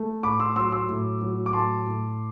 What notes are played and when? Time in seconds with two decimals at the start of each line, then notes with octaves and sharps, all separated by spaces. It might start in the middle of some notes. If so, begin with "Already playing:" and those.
Already playing: A3
0.23 A2 B5 D6
0.40 C6 E6
0.56 F#3 C6 E6
0.72 C6 E6
0.89 A2
1.22 F#3
1.46 D6
1.53 A2 A5 C6
1.86 A2